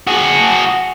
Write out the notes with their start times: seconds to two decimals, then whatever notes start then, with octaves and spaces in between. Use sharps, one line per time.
0.07 F#4 G#4